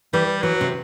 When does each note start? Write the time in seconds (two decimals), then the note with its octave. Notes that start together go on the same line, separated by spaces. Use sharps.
0.13 E3 G3
0.43 E3 F#3
0.61 C3